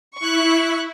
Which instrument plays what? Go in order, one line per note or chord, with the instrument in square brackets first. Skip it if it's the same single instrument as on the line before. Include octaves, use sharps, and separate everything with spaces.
[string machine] E4 [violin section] C#6 F#6